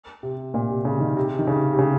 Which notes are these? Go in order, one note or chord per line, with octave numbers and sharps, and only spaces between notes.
C3
A#2
C3
C#3
D#3
C3
D#3
C#3
C3
C#3